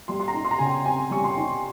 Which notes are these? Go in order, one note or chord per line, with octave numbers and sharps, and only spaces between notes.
G3 C6
C6
A#5
D#4
C6
A#5
C#3 G#5
G5
C4 G#5
G3 C#6
C6
D#4